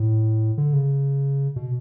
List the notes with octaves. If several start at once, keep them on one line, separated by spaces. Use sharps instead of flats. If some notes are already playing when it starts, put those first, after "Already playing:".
Already playing: A2
D3
C#3
B2